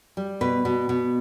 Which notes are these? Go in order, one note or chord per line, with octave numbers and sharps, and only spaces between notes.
G3
B2 B4
B2
B2